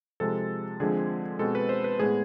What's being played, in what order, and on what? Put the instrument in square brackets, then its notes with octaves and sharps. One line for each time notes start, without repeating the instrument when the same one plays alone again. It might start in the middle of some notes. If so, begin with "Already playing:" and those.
[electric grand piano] C3 F3 G#3 A4
D3 F3 G#3 C4 G#4
B2 G#3 C4 A4
B4
C5
B4
A2 G#3 B3 G#4